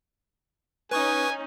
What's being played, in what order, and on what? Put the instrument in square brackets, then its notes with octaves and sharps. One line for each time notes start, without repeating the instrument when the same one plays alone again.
[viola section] C#4 D#4 [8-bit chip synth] B4 C#6 D#6 [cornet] G#5